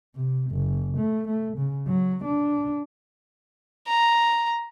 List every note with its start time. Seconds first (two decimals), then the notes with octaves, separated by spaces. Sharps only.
0.16 C3
0.51 F#1
0.97 A3
1.28 A3
1.57 C#3
1.88 F#3
2.25 D4
3.87 A#5